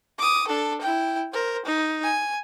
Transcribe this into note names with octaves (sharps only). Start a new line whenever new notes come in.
D6 D#6
D4 A4
E4 G5
A#4 C5
D#4
G#5